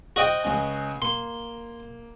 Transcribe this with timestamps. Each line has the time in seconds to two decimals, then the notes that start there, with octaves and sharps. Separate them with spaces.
0.16 F#4 C5 D#5 G5
0.43 C#2 C#4 G#5
1.02 A#3 C6